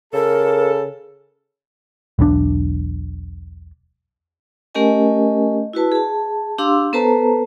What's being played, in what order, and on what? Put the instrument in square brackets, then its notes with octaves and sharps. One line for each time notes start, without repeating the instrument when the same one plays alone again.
[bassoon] C#3 [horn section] A4 [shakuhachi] A#4
[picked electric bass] E1 B1 A#2 D4
[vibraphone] A3 C#4 G4 A#4 D#5 G#5
E4 F#4 B4 A5
G#4 A5
D4 G4 F5 C6 D6 E6
B3 A4 B4 C5 A5 A#5